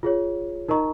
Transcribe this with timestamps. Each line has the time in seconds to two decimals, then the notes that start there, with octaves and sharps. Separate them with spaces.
0.03 F4 G#4 C#5
0.68 D#4 A#4 D#5 A#5 C#6